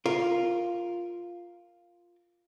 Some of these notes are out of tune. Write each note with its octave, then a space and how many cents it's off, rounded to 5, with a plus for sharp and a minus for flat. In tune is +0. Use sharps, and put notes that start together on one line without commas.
F4 +0 A#4 +0